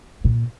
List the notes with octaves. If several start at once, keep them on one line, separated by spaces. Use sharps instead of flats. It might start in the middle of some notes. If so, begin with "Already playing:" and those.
A#2